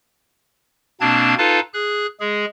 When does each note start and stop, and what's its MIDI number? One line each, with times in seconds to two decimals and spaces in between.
1.00 1.34 47
1.00 1.34 58
1.00 1.34 60
1.00 1.34 62
1.00 1.34 81
1.00 1.34 92
1.38 1.60 63
1.38 1.60 65
1.38 1.60 69
1.38 1.60 71
1.38 1.60 77
1.38 1.60 81
1.74 2.06 68
1.74 2.06 90
2.20 2.45 56
2.20 2.45 68